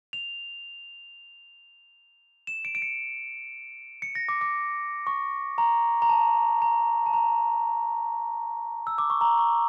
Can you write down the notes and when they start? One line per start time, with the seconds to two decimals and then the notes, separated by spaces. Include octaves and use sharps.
0.13 F7
2.47 E7
2.65 D7
2.75 D7
2.82 C#7
4.02 C#7
4.15 A#6
4.29 D6
4.41 D6
5.07 C#6
5.58 A#5
6.02 A#5
6.09 A5
6.62 A#5
7.06 A5
7.14 A#5
8.87 E6
8.98 D6
9.10 C#6
9.21 A#5
9.38 C#6